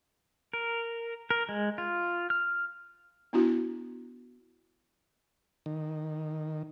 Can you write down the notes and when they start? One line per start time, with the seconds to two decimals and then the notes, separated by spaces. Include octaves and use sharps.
0.53 A#4
1.30 A#4
1.49 G#3
1.78 F4
2.30 F6
3.33 B3 D4 E4 F#4
5.66 D#3